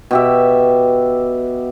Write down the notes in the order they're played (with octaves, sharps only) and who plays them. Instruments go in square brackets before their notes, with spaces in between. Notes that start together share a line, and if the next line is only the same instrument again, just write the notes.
[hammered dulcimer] B2 G4 E5